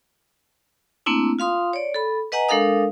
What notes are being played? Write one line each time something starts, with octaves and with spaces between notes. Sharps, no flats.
A3 A#3 C4 D4 E4
F4 F5 C6 D#6
C#5 D5
A4 B5
B4 D#5 F#5 G#5 A#5
G#3 D4 A4 A#4 F5 D#6